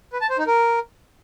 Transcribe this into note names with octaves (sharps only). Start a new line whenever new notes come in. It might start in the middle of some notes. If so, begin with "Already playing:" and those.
B4
A5
C5
D#4
A#4